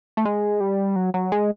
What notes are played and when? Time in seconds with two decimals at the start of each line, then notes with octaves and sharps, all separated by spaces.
0.17 A3
0.25 G#3
0.60 G3
0.96 F#3
1.14 F#3
1.32 G#3